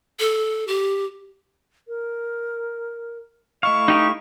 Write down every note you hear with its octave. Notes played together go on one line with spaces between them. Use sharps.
A4
G4
A#4
A3 E4 D#5 F5 C#6
D#4 G4